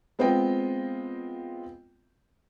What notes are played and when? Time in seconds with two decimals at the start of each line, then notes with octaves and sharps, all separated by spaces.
0.19 G#3 B3 C4 F4 D#5 G5